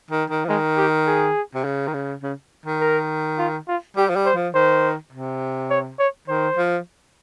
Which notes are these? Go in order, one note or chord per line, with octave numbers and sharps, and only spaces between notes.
D#3
D#3
F3
D#3 G#3
G4
G#4
C3
C#3
D#3
C#3
C#3
D#3
A#4
F4
F4
G3 G4
F3
G3
C5
F3
D#3 C5
C3
C#5
C#5
D#3 C5
F3